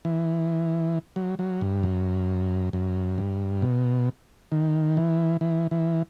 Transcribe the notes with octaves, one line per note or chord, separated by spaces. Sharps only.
E3
F#3
F#3
G2
F#2
F#2
G2
B2
D#3
E3
E3
E3